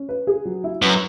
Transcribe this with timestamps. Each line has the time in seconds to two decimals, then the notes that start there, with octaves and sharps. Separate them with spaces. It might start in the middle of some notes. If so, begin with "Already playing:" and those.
Already playing: C#4
0.09 B4
0.27 G#4
0.45 F#3
0.64 E4
0.82 F#2 B4